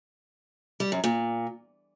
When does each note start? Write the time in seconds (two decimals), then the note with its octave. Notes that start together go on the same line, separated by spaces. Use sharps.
0.80 G3
0.92 F#2
1.04 A#2